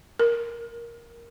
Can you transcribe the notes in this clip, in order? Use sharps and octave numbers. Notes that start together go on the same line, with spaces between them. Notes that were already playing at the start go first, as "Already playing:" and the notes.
A#4